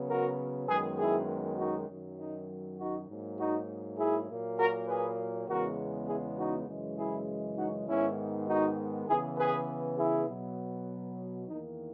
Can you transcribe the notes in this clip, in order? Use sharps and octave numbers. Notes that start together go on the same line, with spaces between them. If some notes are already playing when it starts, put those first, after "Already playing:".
Already playing: C#3 F#3 B3
F#4 A#4
F#2 D#3 G#3 B3 G#4 B4
E4 G#4
D#4 F#4
F#2 D#3 F#3
D#4
D#4 F#4
G#2 F#3 A#3
D#4 F#4
E4 G#4
A#2 F#3 A#3
F#4 A#4
G#4 B4
E2 C#3 G#3 B3 F#4 A#4
E4 G#4
D#4 F#4
F#2 C#3 E3 G#3
E4 G#4
D#4 F#4
G#2 D#3 G#3 B3 C#4 E4
D#4 F#4
C#3 E3 B3 E4 G#4
G#4 B4
E4 G#4
B2 F#3 B3
E2 D#3 A#3 D#4